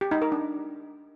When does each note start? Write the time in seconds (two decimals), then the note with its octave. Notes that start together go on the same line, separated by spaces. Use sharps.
0.01 G4
0.11 D#4
0.22 A#4
0.32 D4